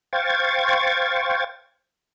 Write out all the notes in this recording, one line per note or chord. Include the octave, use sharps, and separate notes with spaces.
C5 F5 G5 C#6 G#6 A6